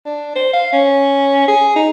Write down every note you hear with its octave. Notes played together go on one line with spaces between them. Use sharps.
D4
C5
F5
C#4
G#4
D#4